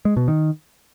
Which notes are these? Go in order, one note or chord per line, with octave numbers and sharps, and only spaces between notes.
G#3
B2
D#3